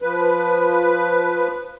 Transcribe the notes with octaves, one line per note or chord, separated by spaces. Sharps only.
F3 B4